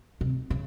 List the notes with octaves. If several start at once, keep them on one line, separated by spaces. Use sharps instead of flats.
C3
C#3